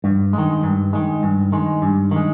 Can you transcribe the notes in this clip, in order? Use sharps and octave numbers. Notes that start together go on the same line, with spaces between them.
G2
D#3 G#3
G2
D#3 G#3
G2
D#3 G#3
G2
D#3 G#3